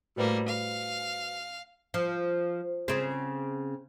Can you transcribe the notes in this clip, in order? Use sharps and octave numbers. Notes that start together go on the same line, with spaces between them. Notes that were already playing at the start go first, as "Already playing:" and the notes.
A2 G3 A#3 F#4 B4 C5
F5
F3
C#3 C4